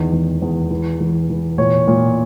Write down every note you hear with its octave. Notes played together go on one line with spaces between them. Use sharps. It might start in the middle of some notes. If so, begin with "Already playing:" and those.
Already playing: E2 D#3
E2
E2
E3
E3
E3
A#2 C#5
A#2